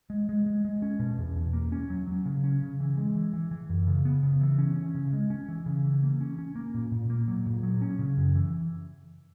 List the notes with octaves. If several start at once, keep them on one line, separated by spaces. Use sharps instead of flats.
G#3
G#3
G#3
G#3
C#4
B2
E2
E2
A#3
C#4
F#3
F#3
C#3
C#4
C#3
E3
G#3
E3
E3
E3
F#2
C#3
B3
C#3
E3
C#4
C#4
C#3
G#3
C#4
E3
C#3
E3
A#3
C#4
C#4
A#3
A#2
A#2
A#3
F#3
A#2
F#3
C#4
C#3
F#2
E3